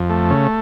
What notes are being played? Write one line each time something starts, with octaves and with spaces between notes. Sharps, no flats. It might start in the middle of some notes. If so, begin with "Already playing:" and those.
Already playing: F2
A3
C#3